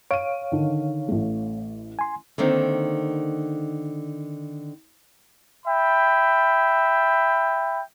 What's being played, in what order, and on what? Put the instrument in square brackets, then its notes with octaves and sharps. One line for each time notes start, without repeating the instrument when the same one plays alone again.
[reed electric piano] C#5 F5 [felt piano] D7 D#7
[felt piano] D3 D#3
A1 A3
[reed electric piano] G#5 C6
[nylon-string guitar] D3 D#3 A#3 C4 D#4
[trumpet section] E5 G5 B5